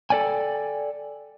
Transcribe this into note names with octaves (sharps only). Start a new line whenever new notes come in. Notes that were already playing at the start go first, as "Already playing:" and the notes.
A4 A#4 D5 G5 G#5